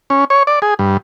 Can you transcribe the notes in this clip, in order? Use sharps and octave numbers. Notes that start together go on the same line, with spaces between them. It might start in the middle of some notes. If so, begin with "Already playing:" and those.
C#4
C#5
D5
G#4
G2